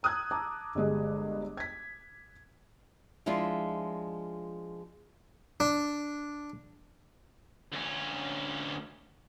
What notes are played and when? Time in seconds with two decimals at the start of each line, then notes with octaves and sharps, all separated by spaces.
0.03 A#5 D#6 E6 F#6 G#6
0.31 A5 A#5 D6
0.75 G1 G2 G#3 D#5
1.57 G#6 B6
3.26 F3 G#3 D4 E4 F4
5.60 D4
7.73 D2 C#4